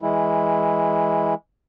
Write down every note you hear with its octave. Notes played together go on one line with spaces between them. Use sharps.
E3 G#3 E4